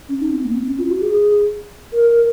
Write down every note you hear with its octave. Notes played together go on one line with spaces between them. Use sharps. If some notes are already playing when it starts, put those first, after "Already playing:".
C#4
D#4
C4
A#3
C4
C#4
F4
F#4
G#4
A#4